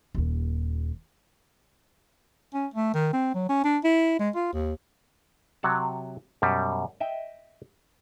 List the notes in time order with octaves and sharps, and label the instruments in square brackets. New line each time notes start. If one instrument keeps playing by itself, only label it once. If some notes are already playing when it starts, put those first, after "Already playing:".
[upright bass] D#1 D#2
[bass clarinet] C#4
A3
D#3
C4
F#3
C#4
D4
E4
G#3
F4
D#2
[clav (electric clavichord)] C3 F#3 F#5 A5
F#2 B2 G3
D#5 E5 G5